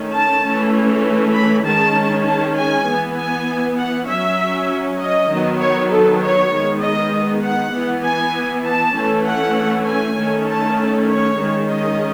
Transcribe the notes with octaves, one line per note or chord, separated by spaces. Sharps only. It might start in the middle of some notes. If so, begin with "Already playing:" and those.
Already playing: D#3 A3 C#4
A5
E3 A3 C#4
B5
D#3 G#3 C#4 A5
A5
G#5
E3 B3
G#5
F#5
F#3 C#4 E5
D#5
D#3 F#3 B3
C#5
A4
C#5
D#3 G#3 B3
D#5
F#5
E3 B3
G#5
A5
E3 A3 C#4
F#5
G#5
D#3 A3 C#4
A5
C#5
D#3 G#3 C#4
D#5